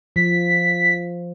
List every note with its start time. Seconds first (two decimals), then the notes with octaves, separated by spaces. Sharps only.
0.16 F3 B6